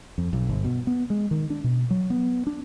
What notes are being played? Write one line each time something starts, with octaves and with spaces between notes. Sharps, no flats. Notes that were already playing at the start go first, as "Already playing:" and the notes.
F2
B1
G1
B2
B3
G#3
D#3
D4
B2
F#3
B3
D4